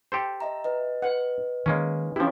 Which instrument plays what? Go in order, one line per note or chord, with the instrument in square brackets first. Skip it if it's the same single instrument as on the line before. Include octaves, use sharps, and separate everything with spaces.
[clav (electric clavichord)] G4 A4 C5
[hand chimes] D#5 E5 A#5
B4 D#5
[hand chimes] B4 D#5 [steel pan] F#5
[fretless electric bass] D#3 [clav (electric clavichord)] G#3 A#3 C#4
[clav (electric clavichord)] F3 E4 [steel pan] C#4 G4